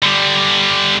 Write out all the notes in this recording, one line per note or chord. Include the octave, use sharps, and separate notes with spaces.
D3 G3